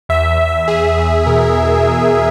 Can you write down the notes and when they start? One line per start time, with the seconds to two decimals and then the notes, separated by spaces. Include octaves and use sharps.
0.09 E2 E5
0.39 E2
0.48 E5
0.68 E2 G#4
0.97 E2
1.26 B2 A#4
1.55 B2
1.85 E2
2.14 B2